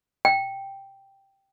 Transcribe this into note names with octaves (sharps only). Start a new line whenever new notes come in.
G5